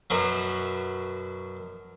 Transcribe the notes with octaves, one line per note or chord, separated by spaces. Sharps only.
F#2 B2 F#3